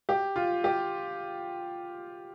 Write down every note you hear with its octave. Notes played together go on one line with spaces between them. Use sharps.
G4
F4
G4